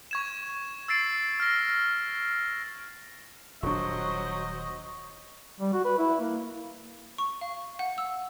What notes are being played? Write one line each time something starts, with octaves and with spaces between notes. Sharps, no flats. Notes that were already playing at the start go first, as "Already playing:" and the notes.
C#6 G#6 E7
E6 A6 C7 D7
F6 A#6
D#1 F#3 D4 C5 D#5 C#6
G3
F#4
B4
E4
A#3
C#6
F5
F#5
E6